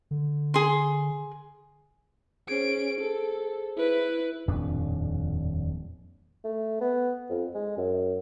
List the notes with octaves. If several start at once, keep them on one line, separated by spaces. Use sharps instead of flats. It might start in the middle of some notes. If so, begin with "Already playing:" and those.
D3
G#4 C6
C#4 G#4 C5 D7
A4
E4 B4
D#1 F2 A2 D4
A3
B3
F2
G#3
F#2